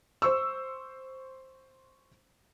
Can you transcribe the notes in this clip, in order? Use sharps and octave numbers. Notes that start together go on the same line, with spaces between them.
C5 C#6 E6